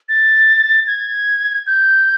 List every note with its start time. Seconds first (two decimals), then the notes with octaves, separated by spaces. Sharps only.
0.09 A6
0.87 G#6
1.67 G6